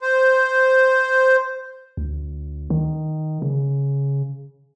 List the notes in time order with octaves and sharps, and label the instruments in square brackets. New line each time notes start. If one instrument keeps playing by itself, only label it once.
[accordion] C5
[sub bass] D2
D#3
C#3